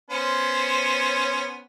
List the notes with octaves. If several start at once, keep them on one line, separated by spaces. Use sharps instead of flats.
B3 C#4 C5